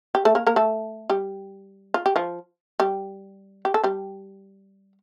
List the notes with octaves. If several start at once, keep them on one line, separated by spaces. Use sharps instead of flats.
G4
A3 A4
A#3 A#4
A#3 A#4
A3 A4
G3 G4
F4
G4
F3 F4
G3 G4
G4
A4
G3 G4